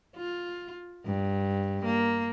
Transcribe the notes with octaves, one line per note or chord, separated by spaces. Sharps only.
F4
G2
A#3